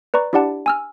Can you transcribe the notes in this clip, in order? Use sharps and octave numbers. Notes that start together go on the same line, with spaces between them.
B4 D5 A#5 C#6
D4 E4 G4 D5 F#5 A5
G#5 E6 F6